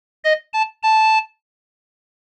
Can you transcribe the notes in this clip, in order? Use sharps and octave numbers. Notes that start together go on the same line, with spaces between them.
D#5
A5
A5